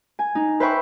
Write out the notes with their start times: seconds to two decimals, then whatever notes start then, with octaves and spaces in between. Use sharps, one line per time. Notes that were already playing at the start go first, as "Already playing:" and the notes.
0.19 G#5
0.35 D#4
0.60 B4 C5 E5 G5 B5 C#6